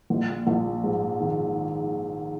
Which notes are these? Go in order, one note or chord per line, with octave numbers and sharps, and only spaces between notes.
A#1
A#1
G#2
D#3